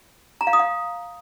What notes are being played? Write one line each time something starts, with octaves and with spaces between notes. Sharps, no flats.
A#5
F5
D#6
F5